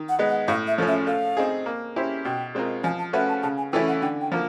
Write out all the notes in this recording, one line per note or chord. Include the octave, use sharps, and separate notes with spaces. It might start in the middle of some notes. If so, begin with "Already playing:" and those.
Already playing: D#3
F#5
G#3 B3 D#4
F#5
A2 F5
E5
F3 A3 C#4
E5
A3 F5
C4 D#4 G#4
A#3
C#4 E4 G4 C5
B2 G5
G#3 C4 F4 A#4
F3 G#5
A5
A3 C#4 F#4 B4 E5
A5
C#3 A5
G#5
E3 A3 C#4 E4 G5
F#5
D3 G5
G5
F3 A#3